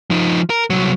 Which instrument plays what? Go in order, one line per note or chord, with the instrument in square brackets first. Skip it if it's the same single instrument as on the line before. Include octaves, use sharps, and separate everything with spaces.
[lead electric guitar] F3 D#4
A#4
C2 F#3